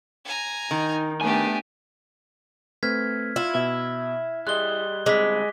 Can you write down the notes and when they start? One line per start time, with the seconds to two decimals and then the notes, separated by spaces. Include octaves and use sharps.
0.25 G#5 A#5
0.71 D#3 D#4
1.21 A3 B3 D4 G4 G#5
2.83 A3 C4 B4 F6 G#6 B6
3.36 E4 F4
3.55 B2 E5
4.47 G3 G#4 D#5 C6 F#6 G7
5.06 D3 G3 G#3 C4 D6 B6